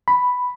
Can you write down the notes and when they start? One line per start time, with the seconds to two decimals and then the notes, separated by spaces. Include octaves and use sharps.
0.08 B5